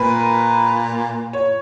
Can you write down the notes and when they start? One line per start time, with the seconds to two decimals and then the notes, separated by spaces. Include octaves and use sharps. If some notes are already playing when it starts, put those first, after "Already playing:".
Already playing: A#2 A#4 B4
1.33 C#5